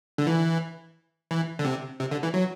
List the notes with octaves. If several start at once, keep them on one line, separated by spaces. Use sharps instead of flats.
D3
E3
E3
D3
C3
C3
D3
E3
F#3